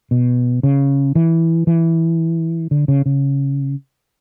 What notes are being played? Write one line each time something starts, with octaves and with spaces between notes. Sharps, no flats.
B2
C#3
E3
E3
D3
C#3
C#3